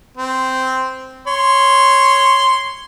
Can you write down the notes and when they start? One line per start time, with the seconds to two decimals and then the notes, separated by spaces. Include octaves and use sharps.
0.17 C4
1.27 C#5 C6